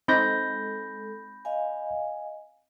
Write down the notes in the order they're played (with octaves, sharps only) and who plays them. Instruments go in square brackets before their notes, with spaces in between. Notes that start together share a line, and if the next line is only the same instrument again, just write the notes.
[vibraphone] G#3 A4 [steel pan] C4 D#4 [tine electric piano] B5 G6 A#6
[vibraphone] D#5 F5 G#5